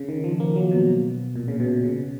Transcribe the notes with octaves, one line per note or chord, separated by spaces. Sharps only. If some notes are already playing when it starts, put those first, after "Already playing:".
Already playing: C#3
D#3
F3
A#3
F#3
B2
A#2
C#3
B2
C#3